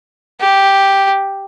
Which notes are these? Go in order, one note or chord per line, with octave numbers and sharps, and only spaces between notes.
G4